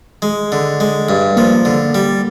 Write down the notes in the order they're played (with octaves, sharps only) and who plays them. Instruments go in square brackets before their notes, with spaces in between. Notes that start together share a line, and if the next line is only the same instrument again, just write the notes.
[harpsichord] G#3
D3
G#3
G2
[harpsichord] F3 [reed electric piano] A#3
[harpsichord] D3
G3